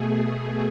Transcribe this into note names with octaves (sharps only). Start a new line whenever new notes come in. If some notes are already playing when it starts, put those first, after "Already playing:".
Already playing: B2 A3 G#4